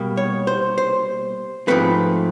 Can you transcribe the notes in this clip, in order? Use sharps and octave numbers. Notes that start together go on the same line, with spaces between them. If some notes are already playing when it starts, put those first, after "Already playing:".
Already playing: B2 G3 A#3
C#5
C5
C5
G#2 F3 A3 C4 B4